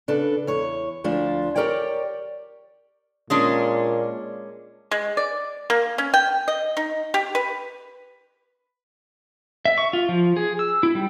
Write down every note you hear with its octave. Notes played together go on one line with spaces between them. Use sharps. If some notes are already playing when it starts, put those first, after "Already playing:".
C#3 D4 A4 B4
E2 C#5
D2 F3 D4 F4
G4 G#4 A#4 C#5 D5 G5
A#2 G#3 C#4 D4
G#3
D5
A#3
C#4
G5
D#5
D#4
G4
B4
E5
C#6
F4
F3
G#4
E6
E4
G3